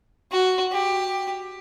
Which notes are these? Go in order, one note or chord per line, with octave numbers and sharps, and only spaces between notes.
F#4
G4